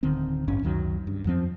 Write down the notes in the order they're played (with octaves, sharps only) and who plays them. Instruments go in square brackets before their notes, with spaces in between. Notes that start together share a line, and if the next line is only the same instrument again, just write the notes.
[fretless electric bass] D1 D3 D#3 C4
A1 G2 C#4
C#2 F#2 D#3 F#3
G2
F2 F3 C4